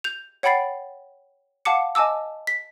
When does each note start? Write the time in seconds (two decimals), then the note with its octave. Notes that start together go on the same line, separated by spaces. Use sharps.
0.04 G6 F7
0.43 C#5 F#5 G5 B5 A6 C7
1.65 F5 F#5 A5 D6 C#7
1.95 D#5 G#5 A5 D6 E6
2.47 B6